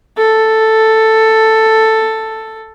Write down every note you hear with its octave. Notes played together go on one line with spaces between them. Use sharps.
A4